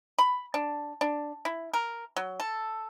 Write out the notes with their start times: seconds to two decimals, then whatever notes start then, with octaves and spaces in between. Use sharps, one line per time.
0.19 B5
0.54 D4
1.01 D4
1.45 E4
1.74 A#4
2.17 F#3
2.40 A4